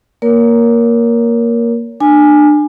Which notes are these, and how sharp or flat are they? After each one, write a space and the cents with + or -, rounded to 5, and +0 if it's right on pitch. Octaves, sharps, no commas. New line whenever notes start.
A#3 +0 A#4 +10 C#5 +30
D4 +25 G#5 +0